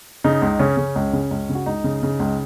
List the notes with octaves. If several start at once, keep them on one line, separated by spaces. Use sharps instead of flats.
C#3 D#4
C#2
C#3 C#4
C#3
C#2
C#3
C#2
C#3
F#4
C#2 D#4
C#3
C#3
C#2